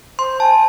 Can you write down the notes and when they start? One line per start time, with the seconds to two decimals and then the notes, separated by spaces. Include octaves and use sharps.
0.19 C5 C6
0.40 G#5 A5